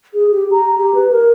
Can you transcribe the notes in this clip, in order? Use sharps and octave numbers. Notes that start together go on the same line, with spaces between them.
G#4
G4
A#5
G4
B4
A#4